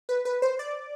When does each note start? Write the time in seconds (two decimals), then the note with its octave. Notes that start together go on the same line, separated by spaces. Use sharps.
0.09 B4
0.25 B4
0.42 C5
0.59 D5